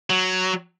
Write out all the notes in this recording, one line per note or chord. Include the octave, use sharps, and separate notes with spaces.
F#3